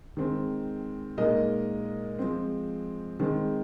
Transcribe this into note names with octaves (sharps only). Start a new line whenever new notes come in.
D#3 G#3 C4
A#2 G#3 D#4 A#4 D#5
F3 G#3 C4
D#3 G#3 C4